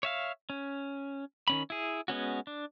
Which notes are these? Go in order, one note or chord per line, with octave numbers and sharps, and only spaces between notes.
C#5 E5 F5
C#4
D#3 C#4 B5
E4 G#4
G#3 B3 C#4 F#4
D4